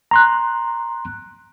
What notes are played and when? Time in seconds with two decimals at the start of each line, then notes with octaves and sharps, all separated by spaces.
0.11 A#5 C6 F#6